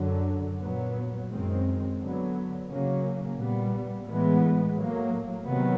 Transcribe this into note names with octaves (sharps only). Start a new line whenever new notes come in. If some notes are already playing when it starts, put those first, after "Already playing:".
Already playing: F#2 D3 F#3
A#2 F#3 B3
F#2 D#3 G#3 C4
D3 F#3 B3
C#3 F#3 A#3 C#4
A#2 G3 B3
A2 E3 G#3 B3
A2 F#3 A#3
C3 D#3 F#3 B3